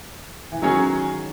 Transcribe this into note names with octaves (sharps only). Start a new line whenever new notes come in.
E3
D#3 F#3 C#4 G#4